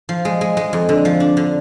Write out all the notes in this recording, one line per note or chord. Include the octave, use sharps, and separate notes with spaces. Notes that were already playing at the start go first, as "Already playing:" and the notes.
F3
G#3
G#3
G#3
F2
D3
F3
D4
D3